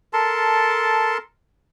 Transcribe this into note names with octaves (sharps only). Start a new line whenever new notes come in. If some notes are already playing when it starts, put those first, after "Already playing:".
A4 A#4 A5 C6